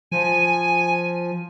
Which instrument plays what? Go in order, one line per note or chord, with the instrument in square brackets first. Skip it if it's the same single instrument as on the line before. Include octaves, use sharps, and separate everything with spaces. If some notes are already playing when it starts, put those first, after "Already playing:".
[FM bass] F3 [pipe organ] G#5